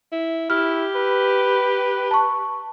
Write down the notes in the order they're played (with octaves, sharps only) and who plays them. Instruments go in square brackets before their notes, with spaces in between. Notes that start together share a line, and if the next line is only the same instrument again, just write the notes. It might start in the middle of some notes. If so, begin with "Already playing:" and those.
[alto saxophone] E4
[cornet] E4 [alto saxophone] G4 [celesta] F6
[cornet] B4
[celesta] A5 C#6